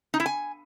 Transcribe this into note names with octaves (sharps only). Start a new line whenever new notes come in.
D#4
E4
G#5